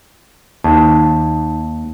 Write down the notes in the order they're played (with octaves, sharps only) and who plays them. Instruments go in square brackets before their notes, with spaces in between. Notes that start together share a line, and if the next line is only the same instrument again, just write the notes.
[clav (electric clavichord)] D#2 [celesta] D#4 A5